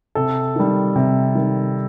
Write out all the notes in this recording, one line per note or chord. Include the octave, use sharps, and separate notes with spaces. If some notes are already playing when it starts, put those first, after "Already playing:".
C3 A4
D#3 G3
C3
D#3 G3